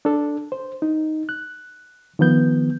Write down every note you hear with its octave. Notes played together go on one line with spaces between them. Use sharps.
D4 A4
C5
D#4
F#6
D#3 F3 B3 G6